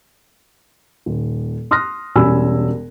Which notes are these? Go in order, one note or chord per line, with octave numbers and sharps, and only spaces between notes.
D#1
C6 D#6 F6 F#6 A#6
E1 G3 C#4 G#5 B5 E6